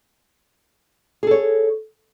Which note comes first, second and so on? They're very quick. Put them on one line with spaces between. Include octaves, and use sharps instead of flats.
G#4 A4 C#5